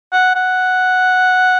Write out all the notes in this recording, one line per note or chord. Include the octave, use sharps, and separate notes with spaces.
F#5
F#5